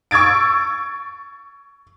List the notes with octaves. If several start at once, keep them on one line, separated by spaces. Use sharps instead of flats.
C#6 E6 G#6 A6 D7